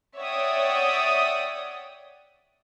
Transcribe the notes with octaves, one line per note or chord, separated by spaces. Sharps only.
C#5 D5 E5 F#5 G5 D#6